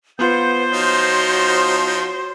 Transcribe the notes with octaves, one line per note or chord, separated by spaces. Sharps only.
B3 F4 B4 C5 F#5 G6
F3 D#4 F#4 C#5 C6